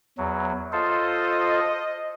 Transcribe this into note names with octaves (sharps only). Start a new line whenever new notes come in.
E2 F#3
F4 A4 C5 D#5